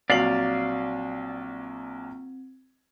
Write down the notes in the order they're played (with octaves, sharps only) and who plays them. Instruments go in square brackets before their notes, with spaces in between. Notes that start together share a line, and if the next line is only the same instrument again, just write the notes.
[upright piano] A#1 F#3 F#7 [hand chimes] C4 [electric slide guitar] D5 F5